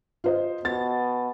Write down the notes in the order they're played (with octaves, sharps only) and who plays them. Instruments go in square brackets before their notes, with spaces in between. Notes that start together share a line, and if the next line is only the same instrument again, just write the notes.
[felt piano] F4 C5 D#5
[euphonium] B2 [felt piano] A6